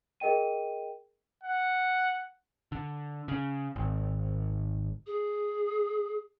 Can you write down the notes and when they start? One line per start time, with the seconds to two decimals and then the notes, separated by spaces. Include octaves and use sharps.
0.20 G#4 A#4 D#5 G5 D#7
1.44 F#5
2.72 D3
3.28 C#3
3.76 G#1
5.07 G#4